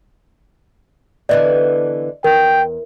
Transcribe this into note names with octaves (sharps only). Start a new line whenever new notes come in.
D3 E3 B3 D5 D#5
E2 A#4 G5